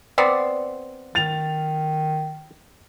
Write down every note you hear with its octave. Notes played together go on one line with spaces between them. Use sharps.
B3 C4 D5
D#3 A6 F7